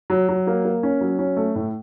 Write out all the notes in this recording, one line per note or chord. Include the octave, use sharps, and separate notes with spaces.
F#3
F#3
A#3
A#3
C#4
F#3
C#4
A3
A2